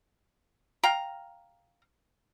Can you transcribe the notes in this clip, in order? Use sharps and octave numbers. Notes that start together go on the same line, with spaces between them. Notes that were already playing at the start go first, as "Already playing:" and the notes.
F5 G5 A#5